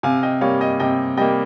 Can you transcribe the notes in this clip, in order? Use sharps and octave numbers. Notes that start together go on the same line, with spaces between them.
C3 F5 G#5
D#5 G5
G3 A#3 C#5 F5
D#5 G5
C3 D#5 G5
G3 A#3 D#5 G5